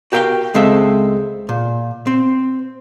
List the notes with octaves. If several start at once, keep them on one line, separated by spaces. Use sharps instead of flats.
F#4 G4 A#4 E5 F5 G5
C#2 G#3 C4 A4 E5 F5
A#2
C4